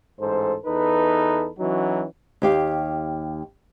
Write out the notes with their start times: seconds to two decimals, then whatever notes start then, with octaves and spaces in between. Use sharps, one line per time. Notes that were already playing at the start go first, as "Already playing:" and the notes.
0.20 A1 G#2 A4 C5
0.66 E2 D#4 A4 B4
1.59 E3 F#3 C#4 D#4 F#4
2.42 D#2 G4 F5